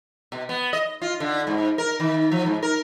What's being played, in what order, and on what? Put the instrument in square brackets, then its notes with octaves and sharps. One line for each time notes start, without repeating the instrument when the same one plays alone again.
[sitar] B2
B3
D#5
F4
D3
G#2
A#4
D#3
F3
G#2
A#4